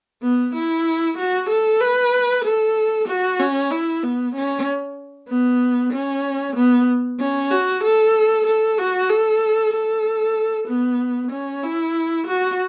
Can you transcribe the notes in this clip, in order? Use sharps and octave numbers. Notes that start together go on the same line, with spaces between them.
B3
E4
F#4
A4
B4
A4
F#4
C#4
E4
B3
C#4
B3
C#4
B3
C#4
F#4
A4
A4
F#4
A4
A4
B3
C#4
E4
F#4